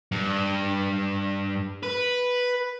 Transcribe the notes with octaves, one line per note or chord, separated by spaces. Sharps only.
G2
B4